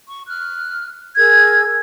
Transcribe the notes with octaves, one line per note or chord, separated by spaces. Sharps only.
C#6
F6 F#6
G#4 A#4 E6 G#6